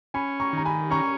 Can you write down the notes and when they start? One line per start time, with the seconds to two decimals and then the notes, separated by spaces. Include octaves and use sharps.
0.14 C#4 G#5 B5
0.40 A#5 C#6
0.53 D#3 A#5
0.65 G#5 B5
0.91 C#4 A#5 C#6